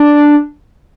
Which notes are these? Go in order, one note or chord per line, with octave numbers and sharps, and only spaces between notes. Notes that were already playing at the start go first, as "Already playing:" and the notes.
Already playing: D4